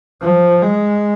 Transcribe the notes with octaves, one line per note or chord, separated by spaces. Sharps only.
F3
G#3